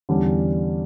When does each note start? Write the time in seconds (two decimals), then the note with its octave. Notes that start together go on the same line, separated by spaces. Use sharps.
0.09 E2 D3 G3 C#4